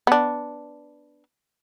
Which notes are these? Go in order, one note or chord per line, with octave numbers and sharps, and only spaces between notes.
B3 D4